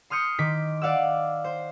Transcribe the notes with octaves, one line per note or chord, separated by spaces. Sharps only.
C6 D#6 F6 G6 C#7
D#3 D6 B6
D5 F5 F#5 E6
C5